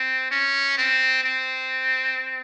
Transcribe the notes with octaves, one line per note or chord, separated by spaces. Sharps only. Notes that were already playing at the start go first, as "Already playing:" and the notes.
Already playing: C4
C#4
C4
C4